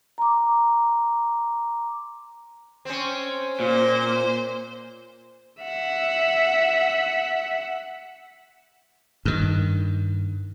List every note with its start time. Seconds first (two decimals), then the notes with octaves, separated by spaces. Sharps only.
0.18 A#5 C6 D6
2.85 C4 C#4
3.60 A#2 C5
5.61 E5 F#5
9.25 G2 D#3